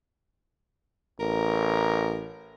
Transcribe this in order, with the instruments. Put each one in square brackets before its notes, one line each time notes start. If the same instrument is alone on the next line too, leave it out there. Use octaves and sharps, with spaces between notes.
[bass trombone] A1 [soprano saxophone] A#4